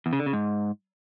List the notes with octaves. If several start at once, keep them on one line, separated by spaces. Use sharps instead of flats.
E2
C#3
D3
C#3
G#2